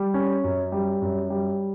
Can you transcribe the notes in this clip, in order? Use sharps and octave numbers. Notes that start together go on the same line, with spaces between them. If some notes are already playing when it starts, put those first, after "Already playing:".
Already playing: G3
C#4
F#2
G3
F#2
G3